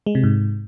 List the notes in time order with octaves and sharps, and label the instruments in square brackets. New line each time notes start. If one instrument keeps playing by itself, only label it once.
[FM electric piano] G#3
C3
G#2